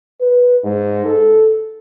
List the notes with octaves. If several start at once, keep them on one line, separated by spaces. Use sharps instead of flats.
B4
G#2
A4